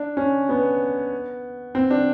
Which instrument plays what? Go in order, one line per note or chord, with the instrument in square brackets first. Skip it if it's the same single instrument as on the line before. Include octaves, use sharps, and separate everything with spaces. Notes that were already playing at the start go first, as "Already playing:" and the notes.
Already playing: [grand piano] D4
C#4
B3
C4
D4